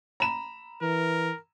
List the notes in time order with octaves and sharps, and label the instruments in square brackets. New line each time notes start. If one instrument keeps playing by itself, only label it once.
[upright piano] A#5 B5 E7
[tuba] E3 [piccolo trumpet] A#4